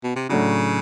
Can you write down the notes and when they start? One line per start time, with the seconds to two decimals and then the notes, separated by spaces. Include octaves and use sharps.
0.04 B2
0.16 C3
0.29 A2 C#3 F#3 A3 D4 F#4